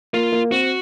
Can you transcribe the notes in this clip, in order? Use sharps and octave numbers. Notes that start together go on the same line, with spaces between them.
A#3 F4
A#3
C4 F#4